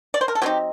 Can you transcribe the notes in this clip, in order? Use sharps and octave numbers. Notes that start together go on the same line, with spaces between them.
D5
C5
A#4
A4
F#3 C4 D#4 G4